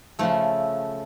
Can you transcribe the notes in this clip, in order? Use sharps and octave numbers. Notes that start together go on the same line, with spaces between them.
C#3 F3 A3 A4